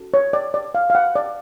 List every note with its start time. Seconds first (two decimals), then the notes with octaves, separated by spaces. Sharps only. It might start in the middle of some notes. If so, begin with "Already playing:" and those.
Already playing: C#4 F#4 A4
0.14 C#5
0.33 D5
0.54 D5
0.75 F5
0.90 F5
0.95 F#5
1.15 D5